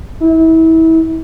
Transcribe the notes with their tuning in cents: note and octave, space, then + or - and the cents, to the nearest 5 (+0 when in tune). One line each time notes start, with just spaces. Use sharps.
E4 -30